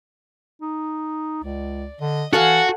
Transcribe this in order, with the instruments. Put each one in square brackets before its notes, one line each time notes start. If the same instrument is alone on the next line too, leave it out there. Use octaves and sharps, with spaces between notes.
[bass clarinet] D#4
[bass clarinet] C#2 [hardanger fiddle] D5
[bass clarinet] D3 [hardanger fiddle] D#5
[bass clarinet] E3 [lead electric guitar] F#4 [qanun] A4 F5 G#5 [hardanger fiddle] F#5